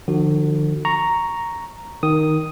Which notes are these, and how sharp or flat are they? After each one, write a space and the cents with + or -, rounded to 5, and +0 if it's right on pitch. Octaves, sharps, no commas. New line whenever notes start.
D3 +35 F3 +0 F#4 +0
A#5 +0 C#6 +0
D#3 +0 D#6 +0